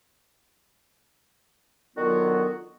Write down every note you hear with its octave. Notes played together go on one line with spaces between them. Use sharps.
D3 D#3 F#3 B3 F4 F#4